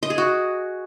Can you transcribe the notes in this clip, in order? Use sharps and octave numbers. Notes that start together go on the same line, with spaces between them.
D#5
G#4
F#4